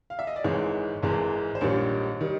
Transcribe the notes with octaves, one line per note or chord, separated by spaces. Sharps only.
F5
E5
D#5
D5
G#1 G#2 E3 G#3 C#5
G#1 G#2 E3 G#3
C5
A#1 G#2 D#3 G3 C#5
D#3 G3